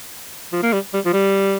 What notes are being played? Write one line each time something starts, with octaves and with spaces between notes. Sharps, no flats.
F3
A#3
G3
G3
F3
G3